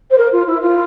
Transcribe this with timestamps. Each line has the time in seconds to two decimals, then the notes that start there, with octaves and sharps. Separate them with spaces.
0.11 C5
0.18 A#4
0.32 F4
0.47 E4
0.61 F4